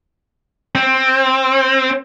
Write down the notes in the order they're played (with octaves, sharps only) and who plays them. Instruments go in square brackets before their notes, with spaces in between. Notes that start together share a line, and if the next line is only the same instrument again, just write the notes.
[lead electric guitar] C4